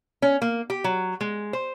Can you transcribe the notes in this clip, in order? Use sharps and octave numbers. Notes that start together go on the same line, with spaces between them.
C#4
A#3
G4
F#3
G#3
C5